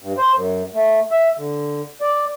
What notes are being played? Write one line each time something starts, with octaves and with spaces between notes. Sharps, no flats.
G2
C5
F#2
A3
E5
D3
D5